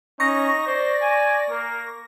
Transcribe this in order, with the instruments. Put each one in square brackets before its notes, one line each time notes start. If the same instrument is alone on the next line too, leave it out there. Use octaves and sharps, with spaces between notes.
[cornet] C#4 [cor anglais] D#4 [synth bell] C#6 A#6
[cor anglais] C5 [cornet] D5
[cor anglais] G#5
[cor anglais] A#3 [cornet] A#4